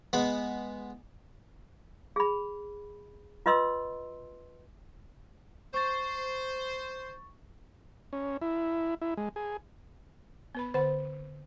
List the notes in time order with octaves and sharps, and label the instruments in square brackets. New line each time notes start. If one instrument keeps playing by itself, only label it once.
[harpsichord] G#3 B3 B5
[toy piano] G#4 B5
F4 B4 D#5 C6 E6
[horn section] C5 [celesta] C#6 A6
[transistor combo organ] C#4
E4
E4
G#3
G#4
[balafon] B3 B4 B5
[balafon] D3 F#5 B5 [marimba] C5